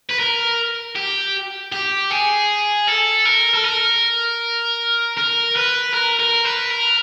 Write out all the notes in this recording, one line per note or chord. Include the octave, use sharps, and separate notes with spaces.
B4
A#4
G4
G4
G#4
A4
A#4
A4
A#4
A#4
B4
A#4
A#4
B4
A#4